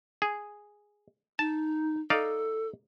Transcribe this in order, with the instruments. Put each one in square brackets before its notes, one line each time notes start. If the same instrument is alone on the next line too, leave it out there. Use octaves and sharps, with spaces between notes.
[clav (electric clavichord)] G#4
[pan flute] D#4 [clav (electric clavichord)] A5
[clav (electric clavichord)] D#4 D5 F5 [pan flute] A4